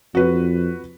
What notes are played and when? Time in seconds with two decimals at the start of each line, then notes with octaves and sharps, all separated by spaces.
0.15 F2 F#4 B4